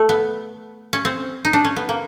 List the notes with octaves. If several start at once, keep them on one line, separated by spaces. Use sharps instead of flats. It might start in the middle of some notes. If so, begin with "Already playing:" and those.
Already playing: A3
B3
C#4
C4
D#4
D4
C#4
B3
A#3